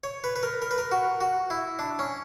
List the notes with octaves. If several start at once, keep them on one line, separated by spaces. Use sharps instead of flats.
C#5
B4
B4
A#4
A#4
B4
A#4
F#4
F#4
E4
D4
C#4